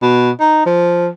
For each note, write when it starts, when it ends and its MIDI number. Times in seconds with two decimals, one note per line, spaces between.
0.02 0.31 47
0.40 0.62 63
0.66 1.09 53